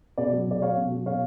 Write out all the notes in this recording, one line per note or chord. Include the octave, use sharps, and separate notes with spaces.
B2 B4 D5
F#3
B2 D5
F#3 C#5 F5
B2
F#3
B2 C#5 F5